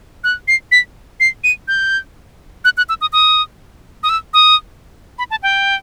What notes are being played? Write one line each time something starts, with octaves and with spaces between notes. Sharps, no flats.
F#6
C7
B6
C7
D#7
G6
F#6
F#6
E6
D#6
D#6
D#6
E6
D#6
B5
A5
G5